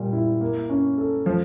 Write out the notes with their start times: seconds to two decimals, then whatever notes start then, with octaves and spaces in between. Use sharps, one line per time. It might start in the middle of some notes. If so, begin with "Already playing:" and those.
Already playing: A#2 G3
0.13 E4
0.41 A#3
0.69 C#4
0.98 A4
1.26 F3